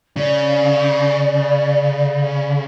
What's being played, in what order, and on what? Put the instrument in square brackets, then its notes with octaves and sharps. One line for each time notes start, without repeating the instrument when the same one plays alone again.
[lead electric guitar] C#3 [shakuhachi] D5